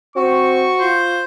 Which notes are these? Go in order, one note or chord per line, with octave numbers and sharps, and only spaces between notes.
C4 F#4 C#6
F4 C5